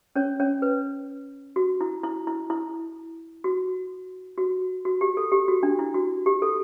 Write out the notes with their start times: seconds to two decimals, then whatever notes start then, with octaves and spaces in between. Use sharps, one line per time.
0.16 C#4 C#5
0.40 C#4 C#5
0.62 B4
1.56 F#4
1.81 E4
2.04 E4
2.27 E4
2.50 E4
3.44 F#4
4.38 F#4
4.85 F#4
5.01 G4
5.17 A4
5.32 G4
5.48 F#4
5.63 D4
5.79 E4
5.95 F#4
6.26 G4
6.42 A4